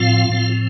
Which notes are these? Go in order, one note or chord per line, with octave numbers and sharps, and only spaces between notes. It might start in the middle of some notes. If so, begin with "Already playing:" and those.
Already playing: A2 F3 C4 F4 F5
A2 F3 C4